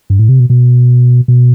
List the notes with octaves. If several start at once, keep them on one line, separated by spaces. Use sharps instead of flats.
G2
A2
C3
B2
B2
B2